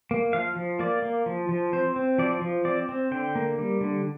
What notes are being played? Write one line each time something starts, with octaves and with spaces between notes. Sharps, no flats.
A#3
F3 F5
F3
A#3 D5
A#3
F3
F3
C4 C5
C4
F3 D5
F3
C4 D5
C4
D3 G5
A#3
G3
D3